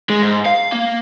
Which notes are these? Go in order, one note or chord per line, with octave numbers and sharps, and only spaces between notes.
G#3
G#2
F5
A#3